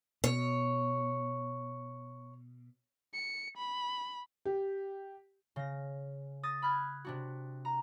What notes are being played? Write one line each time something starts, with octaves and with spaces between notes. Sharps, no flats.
B2 C#5
C#7
B5
G4
C#3 A#6
D#6 A6 A#6
B5 F6 F#6 G#6
C3 D4 F#4
A#5